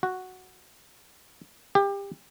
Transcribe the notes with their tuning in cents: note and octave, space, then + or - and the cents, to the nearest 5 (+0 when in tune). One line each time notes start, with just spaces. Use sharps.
F#4 +0
G4 +25